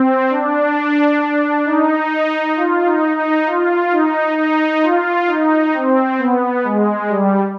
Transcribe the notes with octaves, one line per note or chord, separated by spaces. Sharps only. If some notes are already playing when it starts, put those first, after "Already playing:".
Already playing: C4
D4
D#4
F4
D#4
D#4
F4
D#4
D#4
F4
D#4
C4
B3
G#3
G3